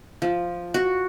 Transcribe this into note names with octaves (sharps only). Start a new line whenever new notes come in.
F3
F#4